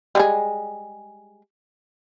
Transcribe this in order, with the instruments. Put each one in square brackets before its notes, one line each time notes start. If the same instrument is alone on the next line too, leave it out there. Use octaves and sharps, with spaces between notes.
[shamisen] G3 G#3 G#4